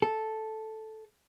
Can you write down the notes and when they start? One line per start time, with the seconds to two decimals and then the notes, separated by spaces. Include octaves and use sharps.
0.02 A4